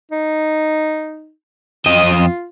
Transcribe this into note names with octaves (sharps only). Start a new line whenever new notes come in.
D#4
F2 F4 D#5